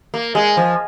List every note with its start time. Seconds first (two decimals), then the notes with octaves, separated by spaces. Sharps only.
0.14 A#3
0.35 G#3
0.57 F3